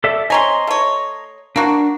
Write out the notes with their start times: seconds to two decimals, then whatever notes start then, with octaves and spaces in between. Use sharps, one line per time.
0.04 A4 D5 E5
0.30 C4 C#5 D#5 G#5 A#5 C6
0.67 A3 C#5
1.56 A#3 D4 F#4